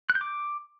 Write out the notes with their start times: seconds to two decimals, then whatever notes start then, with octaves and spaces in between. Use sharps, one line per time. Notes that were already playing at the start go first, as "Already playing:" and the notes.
0.10 F#6
0.15 G6
0.21 D6